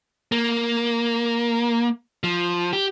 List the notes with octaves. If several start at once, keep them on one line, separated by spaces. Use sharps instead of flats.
A#3
F3
G4